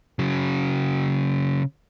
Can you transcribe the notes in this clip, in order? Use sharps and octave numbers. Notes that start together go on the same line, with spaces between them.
C#3 F#3